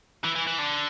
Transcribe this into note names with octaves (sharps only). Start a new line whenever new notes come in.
E3
E3
E3
D3